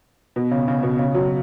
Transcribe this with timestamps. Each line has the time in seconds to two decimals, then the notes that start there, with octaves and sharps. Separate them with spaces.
0.36 B2
0.51 C#3
0.68 C#3
0.83 B2
0.99 C#3
1.15 F#3